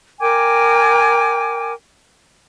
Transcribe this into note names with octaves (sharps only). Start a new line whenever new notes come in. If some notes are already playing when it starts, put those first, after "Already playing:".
A#4 G5 G#5 D6